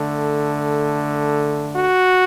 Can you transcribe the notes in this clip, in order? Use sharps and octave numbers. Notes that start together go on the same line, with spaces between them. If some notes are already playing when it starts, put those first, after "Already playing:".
Already playing: D3 A3
F#4